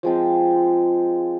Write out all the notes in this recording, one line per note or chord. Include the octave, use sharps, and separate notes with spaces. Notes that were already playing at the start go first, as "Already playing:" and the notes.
F3 G#3 C4 F4